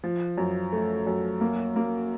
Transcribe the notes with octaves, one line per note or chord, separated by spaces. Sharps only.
F3
F#2
A3
F#2
A#3
A#3